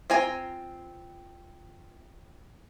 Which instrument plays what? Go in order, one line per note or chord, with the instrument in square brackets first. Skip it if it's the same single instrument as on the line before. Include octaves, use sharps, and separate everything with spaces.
[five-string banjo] C4 F4 G#5 A#5